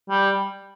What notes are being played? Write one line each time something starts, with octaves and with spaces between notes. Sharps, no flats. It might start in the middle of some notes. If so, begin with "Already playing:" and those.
G3